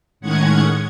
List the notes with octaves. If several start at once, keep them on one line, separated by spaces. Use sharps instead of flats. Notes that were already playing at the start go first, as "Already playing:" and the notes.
A2 D#3 G#3 C#4 F#5 G#6